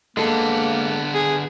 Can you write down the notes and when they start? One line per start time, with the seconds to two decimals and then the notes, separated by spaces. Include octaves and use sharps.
0.17 D3 G#3 A#3 B3 A4
1.14 G#4